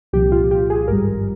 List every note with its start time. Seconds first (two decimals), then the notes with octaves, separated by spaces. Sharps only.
0.13 C2 A#2 F3 G4
0.32 F4
0.51 G4
0.70 G#4
0.88 G#1 G2 G3 A#4